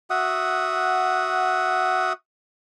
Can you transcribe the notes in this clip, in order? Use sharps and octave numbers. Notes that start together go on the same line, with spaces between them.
F#4 E5 F#5 D#6